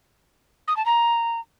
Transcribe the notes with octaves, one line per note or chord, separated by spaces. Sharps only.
D#6
A5
A#5